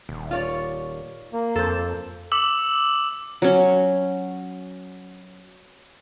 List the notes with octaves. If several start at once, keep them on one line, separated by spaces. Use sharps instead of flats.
D#1
F4 C#5 D5
A#3
F2 A4 C5
D6 E6 F#7
F#3 C#4